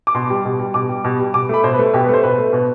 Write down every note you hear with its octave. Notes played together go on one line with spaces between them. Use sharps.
D6
B2 C6
G3
B2
G3
B2 D6
G3
B2
G3
B2 D6
A3 B5
B2 C5
B4
A3
B2 G4
B4
A3 C5
B2 B4
A3
B2